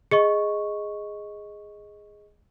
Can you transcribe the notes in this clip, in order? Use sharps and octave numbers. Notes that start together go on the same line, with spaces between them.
G#4 D#5 C#6